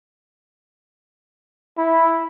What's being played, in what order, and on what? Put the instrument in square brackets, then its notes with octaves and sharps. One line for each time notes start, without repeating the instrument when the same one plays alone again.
[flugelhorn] E4